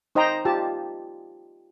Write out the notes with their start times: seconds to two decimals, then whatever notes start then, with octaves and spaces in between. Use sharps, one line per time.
0.15 D#4 C5 D#5 G5 A#5
0.45 F4 G4 A5